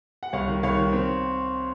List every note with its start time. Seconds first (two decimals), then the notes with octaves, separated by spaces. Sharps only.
0.23 F#5
0.33 C2 C#5 F5
0.48 D#3
0.63 C2 C#5 F5
0.78 D#3
0.93 C4